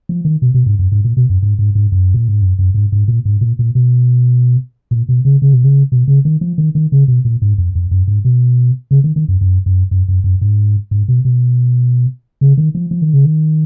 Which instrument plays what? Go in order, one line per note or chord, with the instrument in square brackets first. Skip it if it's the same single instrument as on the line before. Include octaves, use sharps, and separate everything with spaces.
[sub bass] F3
D#3
B2
B2
G#2
F#2
G#2
A#2
B2
F#2
G#2
G#2
G#2
F#2
A#2
G#2
F#2
F#2
G#2
G#2
A#2
G#2
A#2
A#2
B2
A#2
B2
C#3
C#3
B2
C#3
B2
C#3
D#3
F3
D#3
D#3
C#3
B2
A#2
G#2
F2
F2
F#2
G#2
B2
C#3
D#3
D#3
F#2
F#2
F#2
F#2
F#2
F#2
G#2
G#2
B2
B2
C#3
D#3
F3
F3
D#3
C#3
D#3